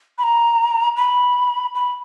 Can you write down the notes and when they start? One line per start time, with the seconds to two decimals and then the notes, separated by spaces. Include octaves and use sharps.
0.18 B5
0.23 A#5
0.97 B5
1.75 B5